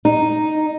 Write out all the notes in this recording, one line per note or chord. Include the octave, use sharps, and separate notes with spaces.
D#4